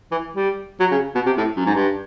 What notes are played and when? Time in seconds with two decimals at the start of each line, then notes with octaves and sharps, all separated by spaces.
0.12 E3
0.35 G3
0.80 F#3
0.91 C#3
1.15 B2
1.26 C3
1.37 A2
1.57 F#2
1.65 G#2
1.75 G2